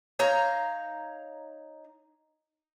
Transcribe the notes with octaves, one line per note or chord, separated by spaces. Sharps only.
D#4 C#5 F5 A#5